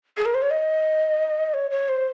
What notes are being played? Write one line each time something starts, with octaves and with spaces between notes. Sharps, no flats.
G#4
A#4
C5
C#5
D#5
C#5
C#5
C5